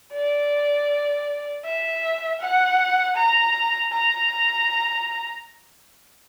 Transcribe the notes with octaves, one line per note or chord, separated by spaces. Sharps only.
D5
E5
F#5
A#5
A#5